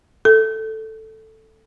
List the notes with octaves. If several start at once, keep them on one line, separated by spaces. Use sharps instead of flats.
A4